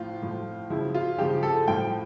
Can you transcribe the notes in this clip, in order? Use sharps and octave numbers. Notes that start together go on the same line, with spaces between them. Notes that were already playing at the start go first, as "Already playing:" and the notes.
Already playing: A2 F3 F4
A2 F3
C#3 F3 E4
F4
C#3 F3 G4
A4
A2 F3 G5